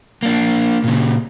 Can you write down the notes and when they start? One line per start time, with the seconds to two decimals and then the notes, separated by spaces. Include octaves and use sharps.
0.23 A#3 D4
0.84 A#2 C#3